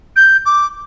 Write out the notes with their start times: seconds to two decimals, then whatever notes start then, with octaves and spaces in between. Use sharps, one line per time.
0.16 G6
0.46 D6